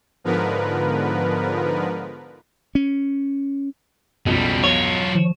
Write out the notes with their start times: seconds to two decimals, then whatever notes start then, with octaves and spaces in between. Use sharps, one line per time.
0.24 G#2 D3 F3 B3 A#4 B4
2.75 C#4
4.26 B1 F2 C#3 G3
4.64 F#3 F4 C#5
5.15 F3